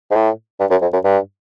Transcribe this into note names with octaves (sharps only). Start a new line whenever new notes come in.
G#2
A2
G2
F#2
F2
F#2
G2